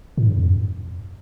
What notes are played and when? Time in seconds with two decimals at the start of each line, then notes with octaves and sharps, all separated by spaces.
0.18 A2
0.27 G2
0.37 F2